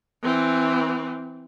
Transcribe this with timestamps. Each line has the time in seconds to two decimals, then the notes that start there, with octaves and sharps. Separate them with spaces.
0.23 E3 C4